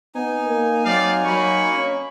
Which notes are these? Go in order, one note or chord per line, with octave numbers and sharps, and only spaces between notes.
B3 D#4 G#5
A#3
F#3 C4 D5 F5
F#3 A#3 B5 C#6
C#4